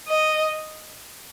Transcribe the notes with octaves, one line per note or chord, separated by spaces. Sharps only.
D#5